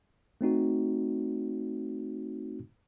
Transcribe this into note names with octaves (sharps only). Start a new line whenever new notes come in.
A3 C4 D#4 F#4